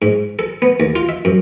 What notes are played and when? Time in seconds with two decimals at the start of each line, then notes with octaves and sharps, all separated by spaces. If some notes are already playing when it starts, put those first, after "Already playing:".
0.02 G#2
0.39 A4
0.62 B3
0.80 D#2
0.96 F4
1.09 E5
1.25 F#2